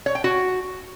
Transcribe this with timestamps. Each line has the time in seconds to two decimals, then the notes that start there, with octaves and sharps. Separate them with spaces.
0.06 C#5
0.15 G5
0.24 F#4